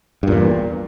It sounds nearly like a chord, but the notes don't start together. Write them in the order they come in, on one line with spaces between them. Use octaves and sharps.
G2 A#2 E2